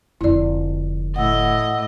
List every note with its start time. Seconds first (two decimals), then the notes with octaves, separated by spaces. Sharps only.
0.21 F1 D3 E4 D5
1.16 A2 D#5 F#5 E6